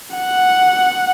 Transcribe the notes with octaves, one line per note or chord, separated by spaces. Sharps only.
F#5